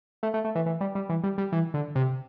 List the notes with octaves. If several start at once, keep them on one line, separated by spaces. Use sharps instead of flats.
A3
A3
A3
E3
E3
G3
G3
E3
G3
G3
E3
D3
C3